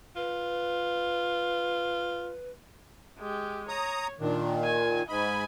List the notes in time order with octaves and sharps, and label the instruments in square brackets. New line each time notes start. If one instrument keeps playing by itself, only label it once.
[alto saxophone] F4 [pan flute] B4
[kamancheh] G#3 G4
[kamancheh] C#5 [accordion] A#5 D#6
[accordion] A#2 D#3 [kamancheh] D4
[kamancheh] G#5
[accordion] G#2 B5 [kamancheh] D#5 G#5